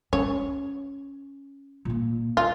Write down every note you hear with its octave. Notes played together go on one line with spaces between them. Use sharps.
C#4 C#5
A#2 A#3
E4 F4